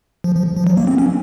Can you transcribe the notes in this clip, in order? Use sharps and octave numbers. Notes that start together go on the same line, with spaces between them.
F3
F3
F3
F#3
A#3
C4
C#4